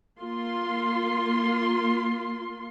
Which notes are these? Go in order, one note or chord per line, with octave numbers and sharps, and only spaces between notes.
A#3 F4 C6